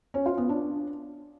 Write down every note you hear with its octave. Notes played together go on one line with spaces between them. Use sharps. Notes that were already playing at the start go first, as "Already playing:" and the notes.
C#4
F4
B3
D4